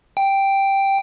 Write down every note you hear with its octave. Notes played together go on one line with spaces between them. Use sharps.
G5